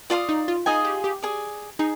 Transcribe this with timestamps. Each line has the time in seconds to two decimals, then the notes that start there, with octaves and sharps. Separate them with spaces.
0.10 F4 D5 F5 C6 D#6
0.29 D#4
0.48 F4
0.66 D#4 F4 G#4 D#5 G#5
0.85 G4
1.04 G4
1.22 G#4 D5 G#5
1.79 D#4 G#4